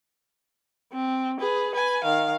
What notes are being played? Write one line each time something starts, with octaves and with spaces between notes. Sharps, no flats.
C4
G#4 B4
B4 G#5
D#3 F5